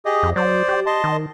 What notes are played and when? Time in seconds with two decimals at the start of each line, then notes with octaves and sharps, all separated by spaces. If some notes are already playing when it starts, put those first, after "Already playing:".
0.05 G4 G#4 D#5
0.23 F2
0.36 F#3 C5 D5
0.69 G4
0.86 D#5 A5 C6
1.04 D#3